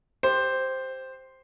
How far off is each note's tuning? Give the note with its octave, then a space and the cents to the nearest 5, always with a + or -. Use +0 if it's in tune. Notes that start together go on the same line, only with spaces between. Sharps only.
G4 +0 C5 +0